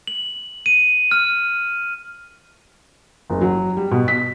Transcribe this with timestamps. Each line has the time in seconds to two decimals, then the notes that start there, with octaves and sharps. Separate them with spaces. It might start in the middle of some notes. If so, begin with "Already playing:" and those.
0.07 F#7
0.66 D#7
1.11 F6
3.30 F#1
3.41 F#3
3.77 G3
3.91 B2
4.08 B6